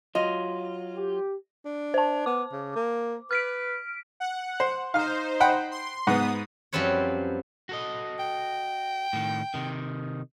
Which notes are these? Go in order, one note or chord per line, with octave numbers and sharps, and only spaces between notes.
F#3 F4 D#5
G4
D4
C5 A5
B3 D6
C#3
A#3
B4 F6 B6 D7
F#5
C5
D#4 C5 F5 F6
F#5 G5 B5
C6
G#2 B3 F#5 D#6
F#2 F3 G3 C4 B4 C#5
F#4 A4 D#5
G5
A2 D#3
C3 D#3